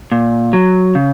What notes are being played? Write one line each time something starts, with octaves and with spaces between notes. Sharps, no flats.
A#2
F#3
C#3